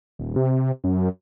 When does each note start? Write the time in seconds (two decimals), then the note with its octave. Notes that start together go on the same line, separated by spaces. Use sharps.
0.19 D#1
0.36 C3
0.84 F#2